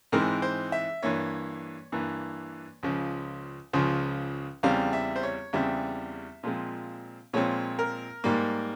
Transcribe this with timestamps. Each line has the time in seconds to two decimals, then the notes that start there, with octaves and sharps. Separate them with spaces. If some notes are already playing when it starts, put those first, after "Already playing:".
0.12 G#2 E3 G#3 C4 A#4
0.42 C5
0.72 E5
1.03 G2 E3 A#3 C#5
1.92 G2 E3 A#3
2.83 C#2 C#3 F3
3.73 C#2 C#3 F3
4.63 E2 C#3 G3 C4 F5
4.93 E5
5.16 C5
5.23 C#5
5.53 E2 C#3 G3 C4 E5
6.43 A#2 F3 G#3 C4
7.33 A#2 F3 G#3 C4 C#5
7.79 A#4
8.24 G#2 G3 A#3